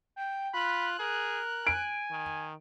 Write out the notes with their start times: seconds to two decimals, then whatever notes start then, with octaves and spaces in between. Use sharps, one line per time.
0.16 G5
0.54 F4 B5 F#6
1.00 G#4 A#4
1.67 G#5 D7
2.11 D#3